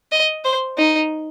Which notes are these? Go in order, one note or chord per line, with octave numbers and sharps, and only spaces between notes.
D#5
C5
D#4